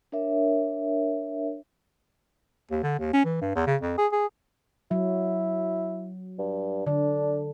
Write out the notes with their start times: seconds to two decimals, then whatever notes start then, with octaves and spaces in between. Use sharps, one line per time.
0.12 D4 A#4 C#5 E5
2.71 D#2
2.83 D3
2.99 D#2
3.13 C#4
3.25 E3
3.41 G2
3.55 E2
3.67 C#3
3.82 F2
3.98 G#4
4.12 G#4
4.91 F#3 E4
6.39 G2
6.87 D3 D4